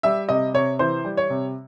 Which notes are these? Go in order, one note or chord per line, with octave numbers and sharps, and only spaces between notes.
G3 E5
C3 D#5
C3 C#5
E3 C5
G3
C#5
C3